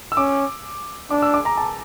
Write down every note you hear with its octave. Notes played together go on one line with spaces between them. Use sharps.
E6
C#4 D6
D4 D6
E6
D6
A#5
A5